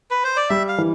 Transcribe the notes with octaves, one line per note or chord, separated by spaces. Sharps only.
B4
C5
D5
G3 E5
F5
E3